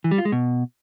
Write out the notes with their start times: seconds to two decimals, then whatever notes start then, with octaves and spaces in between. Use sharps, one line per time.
0.04 E3
0.11 G3
0.18 F4
0.25 G#3
0.32 B2